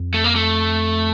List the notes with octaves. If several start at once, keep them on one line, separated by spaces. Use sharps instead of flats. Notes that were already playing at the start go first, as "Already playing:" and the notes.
Already playing: F2
A3
A#3
A3